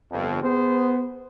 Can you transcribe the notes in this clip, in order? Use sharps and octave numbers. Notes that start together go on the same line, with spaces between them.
G1 F2
B3 G#4 C5